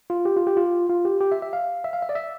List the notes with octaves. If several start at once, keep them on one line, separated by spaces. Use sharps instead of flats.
F4
G4
F4
G4
F4
F4
G4
G4
E5
E5
F5
E5
F5
E5
D5
E5